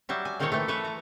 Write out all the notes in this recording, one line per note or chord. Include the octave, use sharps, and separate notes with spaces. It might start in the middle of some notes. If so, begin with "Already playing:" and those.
F#3 G3 E5
G#5
A#2 D#3 F3 G#3 A4 C#5
E3 A3
A4 B4 C#5 E5
A#5